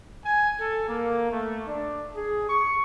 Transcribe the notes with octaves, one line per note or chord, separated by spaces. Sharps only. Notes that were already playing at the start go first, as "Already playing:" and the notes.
G#5
A4
A#3
A3
D4
G#4
C#6